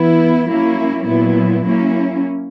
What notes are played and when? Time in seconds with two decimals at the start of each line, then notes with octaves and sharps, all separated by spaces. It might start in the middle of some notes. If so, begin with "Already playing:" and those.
Already playing: E3 B3 E4
0.48 F#3 A#3 C#4 E4
1.05 A#2 F#3 B3 E4
1.63 F#3 A#3 C#4 E4